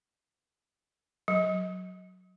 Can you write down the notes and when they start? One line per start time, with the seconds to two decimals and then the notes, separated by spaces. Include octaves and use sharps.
1.28 F#3